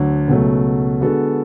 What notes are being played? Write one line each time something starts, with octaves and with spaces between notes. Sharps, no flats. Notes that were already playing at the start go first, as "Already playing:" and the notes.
Already playing: D2 D3 F#3
C#2 B2 F#3 A3
D3 G#3 B3 F#4 A4